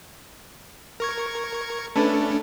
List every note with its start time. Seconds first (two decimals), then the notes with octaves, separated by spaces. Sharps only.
1.00 A#4 C#6 G#6
1.96 A3 C#4 D4 A4 B4